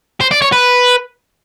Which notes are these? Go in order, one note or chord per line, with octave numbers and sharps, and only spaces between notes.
C5
D5
C#5
B4